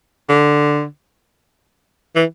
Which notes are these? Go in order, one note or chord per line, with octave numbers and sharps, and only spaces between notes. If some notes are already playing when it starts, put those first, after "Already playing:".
D3
E3